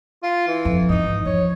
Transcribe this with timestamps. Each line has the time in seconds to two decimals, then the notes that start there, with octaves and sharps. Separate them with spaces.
0.23 F4
0.47 E3
0.65 F2
0.89 E2 G#2 D#4
1.25 F3 C#5